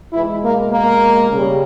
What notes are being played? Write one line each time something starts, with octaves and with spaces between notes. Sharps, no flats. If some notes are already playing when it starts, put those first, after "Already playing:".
B2 E3 G#3 E4
A#3
A#3
C#3 G3